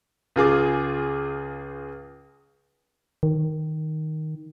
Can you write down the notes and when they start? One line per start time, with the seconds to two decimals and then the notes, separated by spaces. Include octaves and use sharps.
0.36 C#2 F4 G#4 D6
3.23 D#3